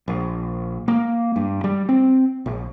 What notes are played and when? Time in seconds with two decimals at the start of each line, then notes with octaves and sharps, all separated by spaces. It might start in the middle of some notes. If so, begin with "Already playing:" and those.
0.08 A#1
0.88 A#3
1.36 G2
1.64 G3
1.89 C4
2.46 A#1